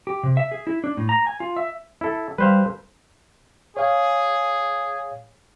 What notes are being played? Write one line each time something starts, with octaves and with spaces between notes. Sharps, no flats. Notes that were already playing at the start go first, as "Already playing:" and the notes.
G4
C3
E5
G#4
E4
D4
A2
A#5
G#5
F4
E5
E4 A4
G3 B4 C5 F5
G#4 C#5 F5